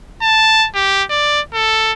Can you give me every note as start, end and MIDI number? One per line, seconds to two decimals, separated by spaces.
0.22 0.67 81
0.75 1.03 67
1.10 1.41 74
1.54 1.93 69